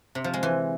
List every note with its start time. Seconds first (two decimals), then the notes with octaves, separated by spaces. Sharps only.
0.15 C3
0.24 F3
0.34 G#3
0.43 E3